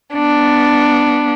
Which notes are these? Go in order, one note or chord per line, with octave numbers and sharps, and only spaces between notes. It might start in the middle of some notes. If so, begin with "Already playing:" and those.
B3 D4